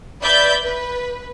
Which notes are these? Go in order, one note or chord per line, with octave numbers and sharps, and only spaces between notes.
B4 D5 E5 B5 G6 A6
B4